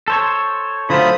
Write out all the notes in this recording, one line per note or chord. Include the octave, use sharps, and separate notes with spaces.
A4 C5 C#5
D3 F#3 A3 F4 C5 B5 D#6